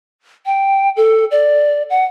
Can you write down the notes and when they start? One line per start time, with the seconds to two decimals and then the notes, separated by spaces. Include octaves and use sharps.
0.46 G5
0.97 A4
1.31 D5
1.90 F#5